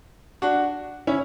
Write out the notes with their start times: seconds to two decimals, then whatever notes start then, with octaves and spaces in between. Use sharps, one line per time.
0.42 D4 F#4
1.07 C#4 E4